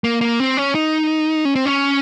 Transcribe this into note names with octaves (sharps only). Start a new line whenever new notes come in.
A#3
A#3
C4
C#4
D#4
C#4
C4
C#4